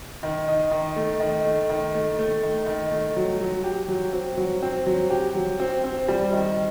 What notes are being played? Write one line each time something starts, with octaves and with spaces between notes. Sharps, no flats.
D#3
D#4
D#3
A3
D#3
A3
D#3
A3
A3
D#3
D#3
A3
F#3
F#3
G4
F#3
C4
F#3
C4
F#3
G4
F#3
C4
C4
G3
D#3